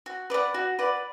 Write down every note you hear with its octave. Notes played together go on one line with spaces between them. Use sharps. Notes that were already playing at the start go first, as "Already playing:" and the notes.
F#4
B4 D5 F#5
F#4
B4 D5 F#5